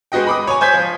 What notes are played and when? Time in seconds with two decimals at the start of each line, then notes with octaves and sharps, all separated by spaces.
0.12 G#3 B3 F#4 D#5 G5
0.27 B5 D6 D#6
0.47 C#5 G#5
0.61 C5 G#5 G6 G#6 B6
0.74 F3